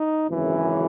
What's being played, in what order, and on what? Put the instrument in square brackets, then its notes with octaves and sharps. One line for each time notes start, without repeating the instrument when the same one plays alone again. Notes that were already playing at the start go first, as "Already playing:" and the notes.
Already playing: [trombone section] D#4
G#1 F#2 C#3 E3